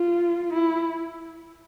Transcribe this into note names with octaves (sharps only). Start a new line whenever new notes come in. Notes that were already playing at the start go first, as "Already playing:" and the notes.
Already playing: F4
E4